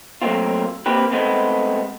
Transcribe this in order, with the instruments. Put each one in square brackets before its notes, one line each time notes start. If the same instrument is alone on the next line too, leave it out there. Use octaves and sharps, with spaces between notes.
[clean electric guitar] F#3 A3 A#3 C4 F4
A#3 C4 G4 B4
G#3 A3 B3 C4